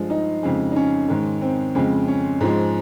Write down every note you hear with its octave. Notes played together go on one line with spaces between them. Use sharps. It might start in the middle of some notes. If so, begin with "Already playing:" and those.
Already playing: G2 F3 G#3
D#4
F2 C#3 G#3
D#4
C#4
G#2 D#3 G#3
C4
F2 C#3 G#3
C#4
G#2 F3 G#3